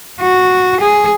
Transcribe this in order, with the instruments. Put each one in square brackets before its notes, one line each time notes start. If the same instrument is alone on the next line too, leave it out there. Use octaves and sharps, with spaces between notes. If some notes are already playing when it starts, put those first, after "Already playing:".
[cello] F#4
G#4